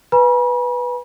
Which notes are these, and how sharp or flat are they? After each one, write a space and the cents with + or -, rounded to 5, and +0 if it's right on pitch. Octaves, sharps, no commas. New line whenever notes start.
B4 +0 G#5 +0 B5 -45